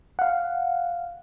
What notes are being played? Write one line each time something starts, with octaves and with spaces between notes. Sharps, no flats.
F5 F#5